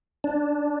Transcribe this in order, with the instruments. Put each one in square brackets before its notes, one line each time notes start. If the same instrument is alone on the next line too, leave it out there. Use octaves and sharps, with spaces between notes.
[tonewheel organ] D4